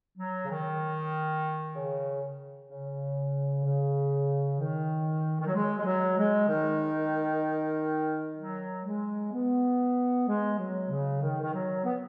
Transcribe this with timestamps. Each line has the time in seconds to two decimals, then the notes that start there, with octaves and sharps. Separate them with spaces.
0.18 F#3
0.45 C#3
0.51 D#3
1.76 C#3
2.71 C#3
3.65 C#3
4.60 D#3
5.41 D#3
5.47 F#3
5.55 G#3
5.79 G#3
5.85 F#3
6.18 G#3
6.49 D#3
8.38 F#3
8.86 G#3
9.33 B3
10.28 G#3
10.59 F#3
10.90 C#3
11.22 D#3
11.42 D#3
11.54 F#3
11.84 B3